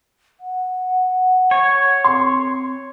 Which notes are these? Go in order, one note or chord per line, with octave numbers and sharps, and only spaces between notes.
F#5
C#5
C4 C6